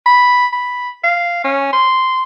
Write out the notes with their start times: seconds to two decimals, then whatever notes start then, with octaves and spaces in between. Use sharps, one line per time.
0.06 B5
0.53 B5
1.04 F5
1.44 C#4
1.73 C6